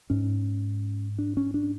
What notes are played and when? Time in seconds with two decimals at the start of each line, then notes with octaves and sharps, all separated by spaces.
0.10 G#2 C#4
1.19 D4
1.37 C#4
1.54 D4